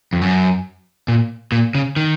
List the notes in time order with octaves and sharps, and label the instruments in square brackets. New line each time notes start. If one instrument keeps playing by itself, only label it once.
[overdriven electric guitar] F2
F#2
A#2
A#2
C#3
D#3